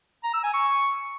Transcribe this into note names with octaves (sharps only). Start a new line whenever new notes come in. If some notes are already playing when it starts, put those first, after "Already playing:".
A#5
E6
G#5
C#6